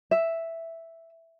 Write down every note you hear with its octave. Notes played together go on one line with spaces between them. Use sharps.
E5